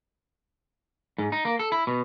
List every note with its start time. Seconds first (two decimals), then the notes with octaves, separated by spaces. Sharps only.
1.18 G#2
1.32 D#4
1.45 A#3
1.59 A4
1.72 E4
1.87 B2